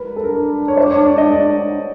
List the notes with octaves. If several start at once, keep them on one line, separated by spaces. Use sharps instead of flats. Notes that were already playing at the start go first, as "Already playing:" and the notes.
Already playing: A#4 B4
A4
D4 A#4
C#5
C5
C#5
D5
D#5
D5